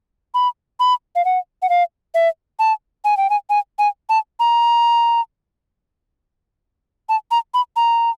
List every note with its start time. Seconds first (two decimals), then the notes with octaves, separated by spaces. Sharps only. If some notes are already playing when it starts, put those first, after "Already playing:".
0.34 B5
0.80 B5
1.16 F5
1.25 F#5
1.62 F#5
1.69 F5
2.15 E5
2.59 A5
3.05 G#5
3.17 G5
3.30 G#5
3.50 G#5
3.79 G#5
4.09 A5
4.40 A#5
7.09 A5
7.31 A#5
7.54 B5
7.76 A#5